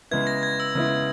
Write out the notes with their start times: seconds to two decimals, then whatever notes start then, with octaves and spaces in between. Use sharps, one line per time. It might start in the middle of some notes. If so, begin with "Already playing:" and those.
0.11 C#3 G#3 B3 E4 G#6
0.27 A#6
0.43 G#6
0.60 E6
0.75 C#3 G#3 B3 E4